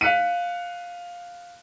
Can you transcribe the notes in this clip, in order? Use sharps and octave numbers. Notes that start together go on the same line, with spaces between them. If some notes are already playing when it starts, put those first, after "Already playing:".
F5 F#6 B6 C#7 D#7